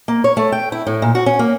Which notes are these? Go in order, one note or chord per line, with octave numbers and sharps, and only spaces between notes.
A#3
C#5
A3
G5
E4
A2
A#2
F#4
C#4
A#3